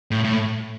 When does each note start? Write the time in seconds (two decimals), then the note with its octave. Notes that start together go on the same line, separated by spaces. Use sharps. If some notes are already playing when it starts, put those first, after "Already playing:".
0.11 A2
0.24 A2